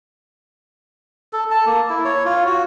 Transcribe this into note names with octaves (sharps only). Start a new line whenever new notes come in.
A4
A5
A#3
E4
C#5
F4
F#4